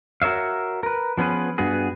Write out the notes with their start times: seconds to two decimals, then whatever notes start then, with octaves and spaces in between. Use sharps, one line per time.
0.22 F#4 A#4 C#5 E5 F5
0.83 A#4 B4
1.17 F3 B3 C#4 G#4 B4
1.58 G2 B3 F#4 G#4